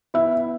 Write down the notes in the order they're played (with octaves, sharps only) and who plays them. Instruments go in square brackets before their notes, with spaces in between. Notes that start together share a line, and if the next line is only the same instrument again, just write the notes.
[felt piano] B3 E4 E5